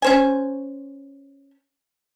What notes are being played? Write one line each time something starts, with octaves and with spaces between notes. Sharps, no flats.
C#4 C5 G#5